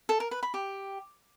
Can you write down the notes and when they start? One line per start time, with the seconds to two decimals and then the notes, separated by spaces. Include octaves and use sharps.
0.09 A4
0.20 A#4
0.31 B4
0.43 B5
0.54 G4